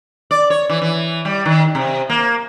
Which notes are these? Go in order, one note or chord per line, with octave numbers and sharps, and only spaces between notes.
D5
C#5
E3
E3
G3
D#3
C3
A#3